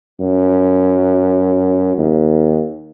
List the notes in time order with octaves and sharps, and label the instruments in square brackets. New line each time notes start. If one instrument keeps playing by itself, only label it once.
[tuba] F#2
D#2